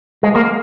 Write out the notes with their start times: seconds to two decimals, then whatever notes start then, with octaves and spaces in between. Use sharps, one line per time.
0.23 G#3
0.35 A#3